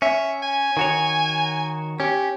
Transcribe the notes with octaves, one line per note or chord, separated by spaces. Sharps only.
C#4 E5
G#5
D#3 F#4 C#5
C#4 G4